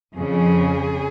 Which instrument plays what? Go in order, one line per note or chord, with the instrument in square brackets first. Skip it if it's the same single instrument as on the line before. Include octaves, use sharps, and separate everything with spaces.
[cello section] F2 C#3 F3 G#4